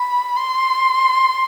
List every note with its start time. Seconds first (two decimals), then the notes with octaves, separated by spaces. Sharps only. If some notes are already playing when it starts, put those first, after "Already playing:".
Already playing: B5
0.36 C6